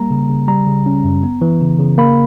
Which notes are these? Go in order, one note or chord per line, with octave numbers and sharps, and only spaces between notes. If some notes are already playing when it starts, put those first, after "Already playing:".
Already playing: G3 A#3 A#5
C#3
C#3
G3 A#5
C#3
C#4
F#2
B3
E3
C#3
C#3
A#3 B5